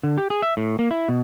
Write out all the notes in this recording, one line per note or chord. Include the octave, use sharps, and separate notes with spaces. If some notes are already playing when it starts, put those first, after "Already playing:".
D3
G4
G#4
E5
A2
A#3
E4
B2